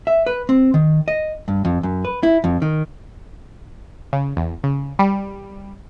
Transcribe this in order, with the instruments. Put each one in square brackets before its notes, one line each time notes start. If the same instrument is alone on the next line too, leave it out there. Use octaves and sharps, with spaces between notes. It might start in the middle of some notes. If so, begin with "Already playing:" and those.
[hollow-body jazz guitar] E5
B4
C4
D#3
D#5
G2
F2
F#2
B4
E4
F2
D#3
[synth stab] C#3
E2
C#3
G3